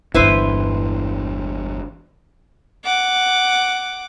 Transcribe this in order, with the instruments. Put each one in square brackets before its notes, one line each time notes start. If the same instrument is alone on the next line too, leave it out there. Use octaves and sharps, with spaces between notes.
[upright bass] G1 G2 [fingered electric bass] E2 D3 [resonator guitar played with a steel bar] E4 B4 C5
[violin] F#5 D6